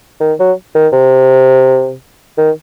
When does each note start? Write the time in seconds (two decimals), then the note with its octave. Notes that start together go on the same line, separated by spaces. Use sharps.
0.20 D#3
0.39 F#3
0.75 D#3
0.93 C3
2.38 D#3